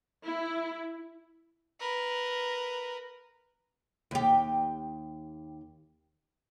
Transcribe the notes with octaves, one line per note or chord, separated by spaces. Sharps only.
E4
A#4 B4
D#2 G4